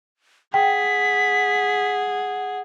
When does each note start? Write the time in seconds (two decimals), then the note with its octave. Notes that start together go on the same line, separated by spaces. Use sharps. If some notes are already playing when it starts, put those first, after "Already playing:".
0.54 G#4 F#5 G5 B6